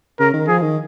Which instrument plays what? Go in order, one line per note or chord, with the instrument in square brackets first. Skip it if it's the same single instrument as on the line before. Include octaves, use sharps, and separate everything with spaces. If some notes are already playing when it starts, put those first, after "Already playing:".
[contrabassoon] C#3 [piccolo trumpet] A#4
[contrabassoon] D#3
[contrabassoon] F3 [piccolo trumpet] G#4
[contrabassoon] D#3